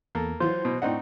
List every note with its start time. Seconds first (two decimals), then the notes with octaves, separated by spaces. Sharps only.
0.15 E2 A#3 A4
0.40 E3 F#3 F4 C5
0.65 B2
0.82 A2 C4 D4 D#4 F#5